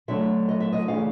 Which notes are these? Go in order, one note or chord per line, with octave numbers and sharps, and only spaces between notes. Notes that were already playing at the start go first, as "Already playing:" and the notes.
D3 F#3 A3 E5
D#5
E5
D#5
C#3 E3 A3 D4 F5